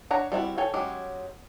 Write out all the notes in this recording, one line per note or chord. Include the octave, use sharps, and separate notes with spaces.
D4 C#5 F#5 A#5
G3 C4 E4 F#4
A4 C#5 G5 G#5
F#3 G#3 C#4 F#4 G4